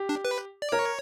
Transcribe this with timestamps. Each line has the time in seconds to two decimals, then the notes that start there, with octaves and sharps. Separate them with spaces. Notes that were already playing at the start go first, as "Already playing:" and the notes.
Already playing: G4
0.09 D4
0.25 B4
0.62 D5
0.72 A#4 C#5